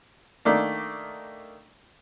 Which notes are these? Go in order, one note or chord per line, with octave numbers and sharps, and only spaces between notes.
D#3 A3 A#3 D4